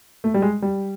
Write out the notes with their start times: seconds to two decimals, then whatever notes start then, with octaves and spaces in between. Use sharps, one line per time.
0.24 A3
0.34 G3
0.42 G#3
0.62 G3